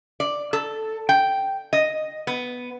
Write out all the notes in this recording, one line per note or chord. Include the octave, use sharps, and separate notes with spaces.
D5
A4
G5
D#5
B3